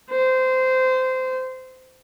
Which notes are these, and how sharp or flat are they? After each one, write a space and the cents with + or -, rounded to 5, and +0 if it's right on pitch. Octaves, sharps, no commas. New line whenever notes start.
C5 -20